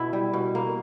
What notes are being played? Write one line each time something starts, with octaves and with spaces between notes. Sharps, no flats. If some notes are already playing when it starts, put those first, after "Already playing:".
Already playing: B2 E4
G3
B2
A#3